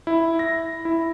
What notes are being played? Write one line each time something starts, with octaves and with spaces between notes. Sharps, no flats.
E4
A#6
E4